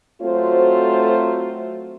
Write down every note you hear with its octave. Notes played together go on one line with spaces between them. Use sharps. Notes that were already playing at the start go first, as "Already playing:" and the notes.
F#3 A3 C4 F4 F#4 C5